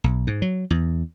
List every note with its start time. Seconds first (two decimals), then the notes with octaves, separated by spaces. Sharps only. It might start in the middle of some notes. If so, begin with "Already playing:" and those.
0.04 B1
0.27 G#2
0.42 F#3
0.70 E2